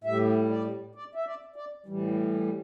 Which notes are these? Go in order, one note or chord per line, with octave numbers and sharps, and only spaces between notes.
A2 G3 E5
D5
D5
E5
D5
D5
A2 E3 G3